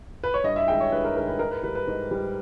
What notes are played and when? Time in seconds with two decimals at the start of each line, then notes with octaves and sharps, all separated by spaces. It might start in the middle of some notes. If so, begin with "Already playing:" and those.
0.24 B4
0.34 C#5
0.44 G2 D#5
0.56 E5
0.68 D#3 G#3 G5
0.80 C#5
0.92 G2 B4
1.04 A#4
1.16 D#3 G#3 A#4
1.28 B4
1.39 G#2 A#4
1.51 B4
1.63 G3 B4
1.75 B4
1.87 G#2
2.11 G3